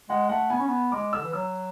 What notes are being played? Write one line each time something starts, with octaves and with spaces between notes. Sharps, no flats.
G#3 F#5
A3 F#5
B3 G#5
C#4
B3
G#3 D6
D3 E6
E3
F#3 E6